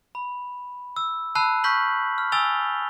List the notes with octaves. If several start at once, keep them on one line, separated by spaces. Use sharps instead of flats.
B5
E6
A5 B5 E6 F#6 C7
C#6 F6 G6 B6 F#7
F6
G#5 D#6 E6 A6 F7 G7